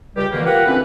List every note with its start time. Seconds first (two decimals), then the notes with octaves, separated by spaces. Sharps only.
0.16 C#2 G3 G4
0.33 F2 B2 D3 E3 G3 A#3
0.45 F4 G4 A#4 B4 F#5
0.66 D2 E3 C4 C#4 B4